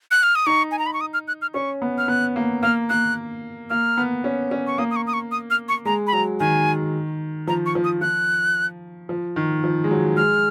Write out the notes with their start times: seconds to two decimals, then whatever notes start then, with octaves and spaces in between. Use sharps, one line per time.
0.11 F#6
0.23 F6
0.35 D#6
0.47 D#4 C#6
0.71 G#5
0.79 A#5
0.86 B5
0.94 C#6
1.01 D#6
1.14 F6
1.28 F#6
1.42 F6
1.54 C#4 C#6
1.82 B3
1.98 F6
2.08 B3 F#6
2.36 A#3
2.63 A#3 F6
2.89 A#3 F#6
3.70 A#3 F6
3.97 B3
4.24 C#4
4.51 C#4
4.67 C#6
4.78 A#3 D#6
4.91 D#6
4.96 C#6
5.07 D#6
5.13 C#6
5.31 D#6
5.50 F6
5.69 C#6
5.85 G#3 A#5
6.07 B5
6.13 F#3 A#5
6.40 D#3 G#5
7.47 F3 A#5
7.66 C#6
7.75 F3
7.84 D#6
8.01 F3 F#6
9.09 F3
9.36 D#3
9.64 F3
9.84 G#3
9.91 F#3
10.17 G#3 F6